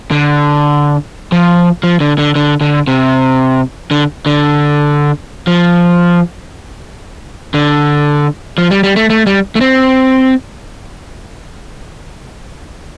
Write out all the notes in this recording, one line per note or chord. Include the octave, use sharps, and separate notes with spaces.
D3
F3
F3
D3
D3
D3
D3
C3
D3
D3
F3
D3
F3
G3
G3
A3
A3
G3
A3
C4